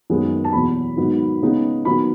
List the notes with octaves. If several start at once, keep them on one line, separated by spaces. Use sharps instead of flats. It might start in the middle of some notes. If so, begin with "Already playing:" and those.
F#2 D#3 G#3 B3
A5
E2 B2 F#3 B5
G#2 D#3 F#3 B3 D#4
C#3 G#3 B3 D#4
D#3 F#3 B3 B5